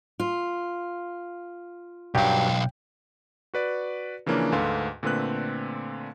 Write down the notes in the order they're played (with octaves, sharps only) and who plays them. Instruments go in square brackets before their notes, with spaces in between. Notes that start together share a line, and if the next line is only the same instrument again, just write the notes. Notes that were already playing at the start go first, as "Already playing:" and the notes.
[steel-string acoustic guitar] F4
[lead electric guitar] B1 F5 [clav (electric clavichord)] G2 F#3 G4 [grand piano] G5
[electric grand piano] F#4 B4 D5
C#3 E3 F3 A#3 C#4 D4
D2 G#2 A4 B4 F5 C6
A#2 D3 A3 C4 B4 F#6